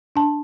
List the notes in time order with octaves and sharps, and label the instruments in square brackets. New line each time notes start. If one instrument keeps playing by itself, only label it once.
[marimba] D4 A5